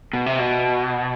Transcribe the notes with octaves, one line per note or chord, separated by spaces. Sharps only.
B2
C3
B2